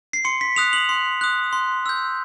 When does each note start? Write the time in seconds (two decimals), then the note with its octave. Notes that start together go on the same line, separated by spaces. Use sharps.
0.13 C7
0.25 C6 C#7
0.41 B6
0.56 D#6 F#6 F7
0.73 F#7
0.89 C6
1.21 D#6 F#6
1.53 C6
1.86 E6 G6